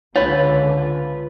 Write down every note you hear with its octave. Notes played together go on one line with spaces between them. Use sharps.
C#2 D3 F4 B4 C#5